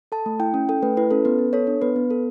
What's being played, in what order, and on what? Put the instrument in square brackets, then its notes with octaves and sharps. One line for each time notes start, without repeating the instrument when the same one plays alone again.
[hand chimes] A4 A5
A3
E4 G5
C#4
A4 G5
A3 B4
E4 B4
C#4 A4
B3 B4
B3
A4 C#5
D4
B3 B4
B3
A4